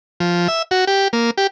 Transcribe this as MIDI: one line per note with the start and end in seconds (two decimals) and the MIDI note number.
0.20 0.48 53
0.48 0.62 76
0.71 0.85 66
0.87 1.08 67
1.13 1.31 58
1.38 1.47 67